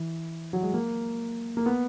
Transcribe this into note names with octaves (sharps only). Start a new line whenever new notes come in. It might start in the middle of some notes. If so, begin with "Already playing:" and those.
Already playing: E3
F#3
G#3
A#3
A#3
B3